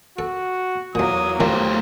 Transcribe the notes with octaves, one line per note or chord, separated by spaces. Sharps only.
F#4 A4
B1 E2 A#2 F#3 A#3 D#6
F2 A2 D#3 A3 G4 C5